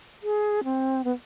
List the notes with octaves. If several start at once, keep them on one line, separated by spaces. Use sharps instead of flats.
G#4
C4
B3